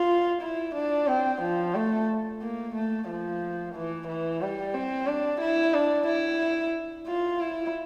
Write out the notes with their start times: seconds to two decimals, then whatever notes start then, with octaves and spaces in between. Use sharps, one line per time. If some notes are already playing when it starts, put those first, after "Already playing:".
Already playing: F4
0.42 E4
0.75 D4
1.08 C4
1.42 F3
1.75 A3
2.41 A#3
2.75 A3
3.08 F3
3.75 E3
4.08 E3
4.41 G3
4.74 C4
5.07 D4
5.41 E4
5.74 D4
6.07 E4
7.07 F4
7.40 E4